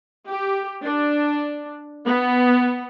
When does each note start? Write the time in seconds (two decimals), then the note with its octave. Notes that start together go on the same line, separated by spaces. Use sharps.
0.27 G4
0.83 D4
2.05 B3